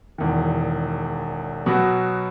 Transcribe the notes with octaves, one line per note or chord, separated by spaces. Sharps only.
E1 E2 D#3
B2 F#3 B3 F#4